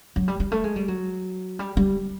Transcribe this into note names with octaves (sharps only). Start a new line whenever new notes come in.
F#3
G3
G3
A3
G#3
G3
F#3
G3
G3